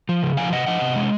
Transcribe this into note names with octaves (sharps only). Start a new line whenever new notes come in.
F3
C#3
F3 F5 G#5
C3 D#5 F#5
F3 D#5 F#5
C3
G#3